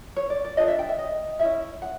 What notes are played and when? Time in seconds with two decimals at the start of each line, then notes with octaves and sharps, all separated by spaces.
0.16 C#5
0.30 D5
0.44 D5
0.57 D4 F4 A4 D#5
0.68 E5
0.79 G5
0.89 E5
0.99 D#5
1.39 C#4 E4 G#4 E5
1.82 F#5